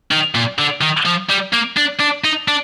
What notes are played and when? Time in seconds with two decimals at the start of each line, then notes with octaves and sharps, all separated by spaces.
0.11 D#3
0.35 A#2
0.59 D3
0.82 D#3
1.06 F3
1.30 G3
1.53 A#3
1.77 D4
2.00 D4
2.25 D#4
2.48 D4